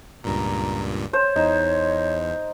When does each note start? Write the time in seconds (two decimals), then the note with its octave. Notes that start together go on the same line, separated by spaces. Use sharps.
0.24 C#2 G2 A#2 A#5
1.13 C5 C#5
1.36 E2 D#4